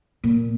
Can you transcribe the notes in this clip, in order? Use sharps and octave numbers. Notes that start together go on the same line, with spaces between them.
A#2